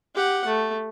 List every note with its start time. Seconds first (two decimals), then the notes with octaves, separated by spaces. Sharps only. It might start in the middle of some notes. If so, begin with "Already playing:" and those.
0.15 G4 F#5
0.47 A3